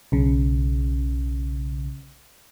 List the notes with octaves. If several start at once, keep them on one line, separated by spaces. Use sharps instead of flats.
B1 C#3